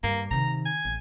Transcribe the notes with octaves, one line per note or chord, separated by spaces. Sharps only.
G2 A#3
C3 D#3 A#5
G#5
A1